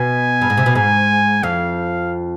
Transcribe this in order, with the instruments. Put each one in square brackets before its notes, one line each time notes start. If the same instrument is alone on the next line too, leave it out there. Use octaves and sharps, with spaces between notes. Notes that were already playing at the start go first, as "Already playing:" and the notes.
Already playing: [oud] B2 [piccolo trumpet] G#5
[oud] G2
G#2
C3
B2
[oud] G#2 [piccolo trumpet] G#5
[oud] F2 [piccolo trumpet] F5